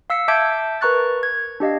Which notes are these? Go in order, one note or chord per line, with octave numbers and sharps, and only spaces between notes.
F5 E6 B6 C#7
E5 A5 D6 G6 G#6 D7
A#4 B4 A#5 C#6 F#6 A6
G#6
D4 G4 D#5 F5